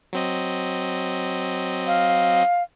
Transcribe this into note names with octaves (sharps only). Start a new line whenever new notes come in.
F#3 C4 D#5
F5